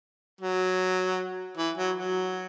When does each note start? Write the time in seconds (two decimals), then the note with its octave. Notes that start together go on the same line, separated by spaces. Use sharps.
0.41 F#3
1.57 E3
1.77 F#3
1.97 F#3